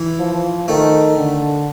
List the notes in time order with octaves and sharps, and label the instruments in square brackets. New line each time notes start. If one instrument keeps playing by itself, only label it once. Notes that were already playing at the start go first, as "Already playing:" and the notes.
Already playing: [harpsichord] E3
[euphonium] F3
[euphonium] D#3 [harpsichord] A3
[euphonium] D3